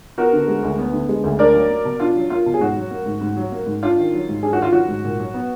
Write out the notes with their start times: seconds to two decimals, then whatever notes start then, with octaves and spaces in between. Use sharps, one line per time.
0.18 B3 F#4 A#4
0.33 D3
0.48 G#3
0.63 D2
0.79 B3
0.93 D3
1.09 G#3
1.24 D2
1.39 D4 A#4 D5
1.54 F#3
1.70 A#3
1.85 B2
2.00 D4 F4
2.16 F#3
2.30 A#3 F4
2.46 B2
2.54 G#4
2.60 G#2 F#4
2.76 F#3
2.91 A#3
3.06 G#2
3.21 G#2
3.37 F#3
3.52 A#3
3.66 G#2
3.83 D4 F4
3.98 D#3
4.13 F#3
4.28 G#2
4.43 D4 G#4
4.53 F#4
4.59 D#3 F4
4.73 F#3 F#4
4.88 G#2
5.04 A#2
5.19 F#3
5.34 B3